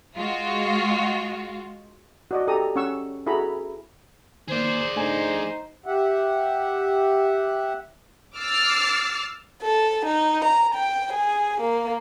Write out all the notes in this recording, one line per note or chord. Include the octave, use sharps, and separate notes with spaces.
G#3 F4 F#4
F#4 D5 D#5
G4 A4 A#5 D#6
C#4 F#5 C#6 E6
E4 F#4 G#4 A4 A#5 B5
D#3 A#3 G#4 C5 D5
A3 D4 D#4 C5 G#5
G4 E5 F#5
D6 E6 F6 A6 C7
A4
D#4
A#5
G5
G#4
A#3